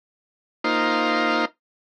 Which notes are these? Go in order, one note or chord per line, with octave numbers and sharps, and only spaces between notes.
A#3 D#4 F4 C5